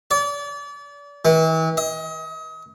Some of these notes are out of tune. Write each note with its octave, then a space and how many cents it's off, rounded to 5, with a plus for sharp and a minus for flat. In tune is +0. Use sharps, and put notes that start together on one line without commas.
D5 -35
E3 -40
D#5 +35